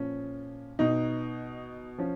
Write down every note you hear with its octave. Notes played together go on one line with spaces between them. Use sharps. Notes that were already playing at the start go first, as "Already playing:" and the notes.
Already playing: A#2 F3 C#4
B2 D#4
F3 C#4